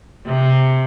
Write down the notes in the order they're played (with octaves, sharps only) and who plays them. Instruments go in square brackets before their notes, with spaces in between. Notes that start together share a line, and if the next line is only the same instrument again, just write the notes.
[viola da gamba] C3